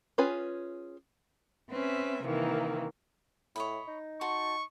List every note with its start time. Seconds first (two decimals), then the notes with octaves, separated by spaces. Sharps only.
0.18 C#4 F4 G#4 B4 G#5
1.71 C4 C#4 B4 E5
2.23 C3 D#3 E3 A#3
3.56 A2 C#5 D#5 B5
3.88 D#4
4.21 F#4 A5 C6 C#6